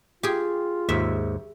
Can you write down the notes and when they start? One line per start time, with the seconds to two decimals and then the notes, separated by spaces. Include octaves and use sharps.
0.23 F4 G4 G#4
0.89 D#2 G#2 E5